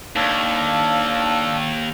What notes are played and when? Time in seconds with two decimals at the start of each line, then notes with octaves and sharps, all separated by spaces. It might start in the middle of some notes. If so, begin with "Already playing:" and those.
0.16 D#2 D4 A4 F5